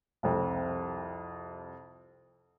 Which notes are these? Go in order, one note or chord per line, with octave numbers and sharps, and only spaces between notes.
C2 F2